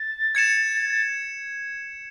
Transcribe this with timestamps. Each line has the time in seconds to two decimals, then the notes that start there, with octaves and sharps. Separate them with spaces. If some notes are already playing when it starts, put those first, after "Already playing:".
Already playing: A6
0.35 G#6 C#7 E7
0.92 A6